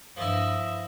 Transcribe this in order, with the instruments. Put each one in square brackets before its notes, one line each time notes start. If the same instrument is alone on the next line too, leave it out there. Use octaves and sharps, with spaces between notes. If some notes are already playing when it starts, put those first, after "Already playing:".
[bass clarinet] G2 [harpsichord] F3 E4 [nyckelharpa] D#5 E5